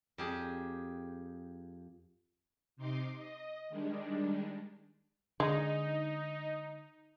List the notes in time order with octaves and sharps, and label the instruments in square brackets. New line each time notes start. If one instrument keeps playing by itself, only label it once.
[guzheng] F2 G4 G#4
[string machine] C3 D#4 C6 D6
D#5
D#3 G3 G#3 D4
[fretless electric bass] D3 [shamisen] G#3 [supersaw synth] D#4